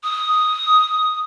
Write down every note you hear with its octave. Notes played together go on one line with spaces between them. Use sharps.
D#6